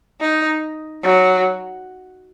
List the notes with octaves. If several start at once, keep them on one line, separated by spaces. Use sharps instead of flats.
D#4
F#3